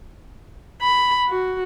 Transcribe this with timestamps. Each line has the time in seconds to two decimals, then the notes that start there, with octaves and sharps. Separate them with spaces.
0.82 B5
1.28 F#4